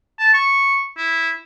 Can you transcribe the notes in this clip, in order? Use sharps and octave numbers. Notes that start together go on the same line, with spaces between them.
A5
C#6
E4